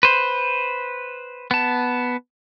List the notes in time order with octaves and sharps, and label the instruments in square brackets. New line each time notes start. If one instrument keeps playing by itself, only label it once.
[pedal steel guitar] B4 C5
B3 A5